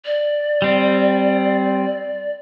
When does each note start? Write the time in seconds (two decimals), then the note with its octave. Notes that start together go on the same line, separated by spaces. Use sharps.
0.06 D5
0.62 G3 C4